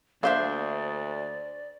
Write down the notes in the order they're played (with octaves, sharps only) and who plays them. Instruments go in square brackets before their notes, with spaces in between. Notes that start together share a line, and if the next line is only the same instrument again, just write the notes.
[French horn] D2 [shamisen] A#3 F5 [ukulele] D4 C5 E5 [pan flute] D5